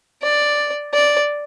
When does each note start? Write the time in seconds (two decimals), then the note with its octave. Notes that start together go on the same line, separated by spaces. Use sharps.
0.22 D5
0.94 D5